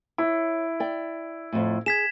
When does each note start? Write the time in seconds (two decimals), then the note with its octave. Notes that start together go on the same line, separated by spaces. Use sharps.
0.18 E4 C#5
0.80 D5 G5
1.52 F2 A2
1.86 G#4 G#6 B6 E7